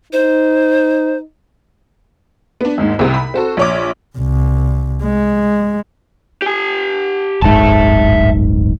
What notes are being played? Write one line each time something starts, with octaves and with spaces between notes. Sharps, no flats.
D#4 C5
B3 D4
G#1 D#2 G#2
C2 C3
B5
C4 F#4 A4
A#1 C#5 D6
C2
G#3
G4 G#5
D1 G1 G#2 E5 A5